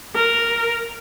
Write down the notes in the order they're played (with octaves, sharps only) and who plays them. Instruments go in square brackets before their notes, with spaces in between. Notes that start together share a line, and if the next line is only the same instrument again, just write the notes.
[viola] A#4